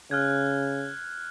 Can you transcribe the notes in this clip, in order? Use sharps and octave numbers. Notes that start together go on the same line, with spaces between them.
C#3 F6 F#6 G#6